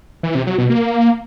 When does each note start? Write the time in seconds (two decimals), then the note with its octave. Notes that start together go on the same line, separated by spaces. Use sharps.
0.23 E3
0.35 C3
0.47 F#3
0.58 B2
0.70 A#3